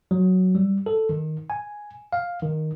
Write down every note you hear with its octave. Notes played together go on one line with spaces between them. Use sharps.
F#3
G3
A4
D#3
G#5
F5
D#3